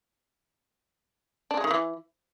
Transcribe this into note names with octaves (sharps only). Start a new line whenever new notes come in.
D4
G#3
D#3
E3